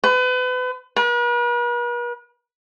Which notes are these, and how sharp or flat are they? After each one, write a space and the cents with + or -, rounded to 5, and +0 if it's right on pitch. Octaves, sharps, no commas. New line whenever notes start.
B4 +35
B4 -45